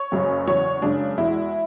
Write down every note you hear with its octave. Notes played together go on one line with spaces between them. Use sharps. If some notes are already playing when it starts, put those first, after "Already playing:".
Already playing: C#5
F#1 F#2 C#3
E2 C#3 F#3 C#5
F#2 C#3 G#3 D4
E2 B2 G#3 E4